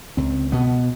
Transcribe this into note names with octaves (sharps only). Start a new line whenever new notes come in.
C#2 C4
B2 B3